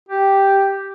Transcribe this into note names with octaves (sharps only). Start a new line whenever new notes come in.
G4